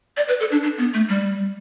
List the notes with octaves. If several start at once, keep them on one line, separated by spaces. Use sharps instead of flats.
D5
B4
A4
D4
D4
B3
A3
G3